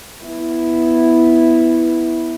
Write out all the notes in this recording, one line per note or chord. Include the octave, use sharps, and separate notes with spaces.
B3 E4